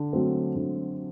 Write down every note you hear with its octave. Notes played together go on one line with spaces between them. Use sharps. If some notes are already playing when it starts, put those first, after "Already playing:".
Already playing: D3
F#3 A3 C4
D3